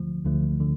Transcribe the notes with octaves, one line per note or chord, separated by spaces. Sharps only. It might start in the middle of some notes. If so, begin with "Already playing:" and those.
Already playing: D2 D3 F3 A3
D2 D3 F3 A3
D3